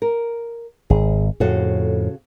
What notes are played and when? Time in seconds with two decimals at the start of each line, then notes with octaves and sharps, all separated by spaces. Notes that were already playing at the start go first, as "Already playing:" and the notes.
0.02 A#4
0.90 G#1 G#4
1.40 F2 A2 C#3 F#4 A4